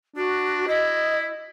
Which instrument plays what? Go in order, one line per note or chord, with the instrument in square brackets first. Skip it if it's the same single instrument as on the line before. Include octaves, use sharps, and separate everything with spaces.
[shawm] D4 [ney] F#4
[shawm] E4 [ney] D#5